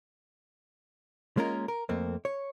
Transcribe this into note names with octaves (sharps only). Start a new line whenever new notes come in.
G#3 A#3 C#4 F4 A#4
A#4
F2 A3 A#3 C4
C#5